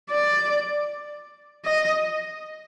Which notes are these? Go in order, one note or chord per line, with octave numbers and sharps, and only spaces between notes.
D5
D#5